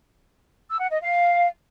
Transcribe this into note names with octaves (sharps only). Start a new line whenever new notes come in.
E6
F#5
D#5
F5